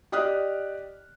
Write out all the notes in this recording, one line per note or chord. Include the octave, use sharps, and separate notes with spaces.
G4 D5 D#5 D#6 F6 F#6